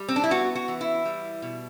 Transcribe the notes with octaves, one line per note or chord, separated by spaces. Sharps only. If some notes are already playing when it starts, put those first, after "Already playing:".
Already playing: G3
C4
D4
E4
B3 F#4
F#4
E3
E4
G3
B2